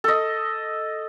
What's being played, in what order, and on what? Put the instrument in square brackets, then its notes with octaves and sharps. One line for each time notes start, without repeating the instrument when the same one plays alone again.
[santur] A4 D#5